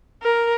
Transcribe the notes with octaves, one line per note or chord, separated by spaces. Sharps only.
A#4